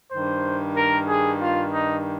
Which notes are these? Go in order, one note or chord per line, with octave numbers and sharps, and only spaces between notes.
G2 D#3 C5
A#4
G#4
F4
D#4